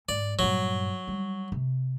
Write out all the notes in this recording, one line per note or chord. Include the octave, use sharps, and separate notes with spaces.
G#2 D5
G2 A#2 F#3
G3
C3